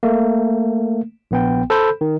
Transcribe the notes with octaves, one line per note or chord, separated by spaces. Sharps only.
A3 A#3
A#1 B3 G5
A4 C5 B5 G6
D#3